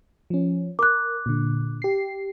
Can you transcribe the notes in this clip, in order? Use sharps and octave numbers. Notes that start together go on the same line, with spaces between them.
F3 C#4
A#4 D6 F#6
A#2 D3
G4 C7